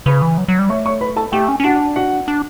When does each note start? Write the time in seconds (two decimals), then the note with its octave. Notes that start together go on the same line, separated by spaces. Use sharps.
0.06 C#3 B4 B5
0.22 E3
0.38 F#3
0.48 F#3
0.59 G3
0.69 A3 C#5 C#6
0.86 C#5 C#6
1.01 B4 B5
1.16 A4 A5
1.32 A3 G4 G5
1.48 C#4
1.60 C#4
1.64 D4 F#4 F#5
1.96 F#4 F#5
2.28 D4